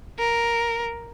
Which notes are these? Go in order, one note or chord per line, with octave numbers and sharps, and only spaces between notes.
A#4